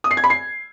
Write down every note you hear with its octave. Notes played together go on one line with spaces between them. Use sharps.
D#6
C7
G#6
B5
C7